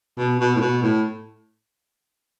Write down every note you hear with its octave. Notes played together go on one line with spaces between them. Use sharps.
B2
B2
A2
B2
A2